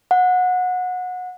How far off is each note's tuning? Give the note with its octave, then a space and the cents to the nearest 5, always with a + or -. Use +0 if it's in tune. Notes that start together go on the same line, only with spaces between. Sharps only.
F#5 -25